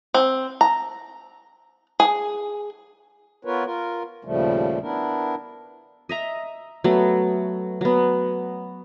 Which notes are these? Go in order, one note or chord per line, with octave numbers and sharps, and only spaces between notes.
C4
A#5
G#4
B3 F4 A#4 B4 C#5
F4 A#4
D#2 A#2 C#3 F3 G3 A3
B3 D4 E4 A#4
D#5 E5 A#5
F#3 A3 B3
F#3 B3